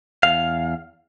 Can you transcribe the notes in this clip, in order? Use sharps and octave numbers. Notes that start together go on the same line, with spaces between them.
E2 F5